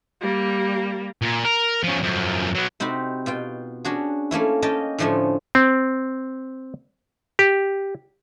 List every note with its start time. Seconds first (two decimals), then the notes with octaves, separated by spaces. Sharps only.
0.21 G3 A#3
1.22 A#2
1.45 A#4
1.83 F3 C#4
2.03 F#2 F3
2.55 F#3 B3
2.80 C3 C4 D#4 F#4 B5
3.26 B2 F4 G5
3.85 C#4 D4 F#4 G#4
4.31 A3 A#3 C#4 E4
4.62 A#3 C#4 D#5 G5 A5
4.98 A2 D3 F3 A3 C#4
5.55 C4
7.39 G4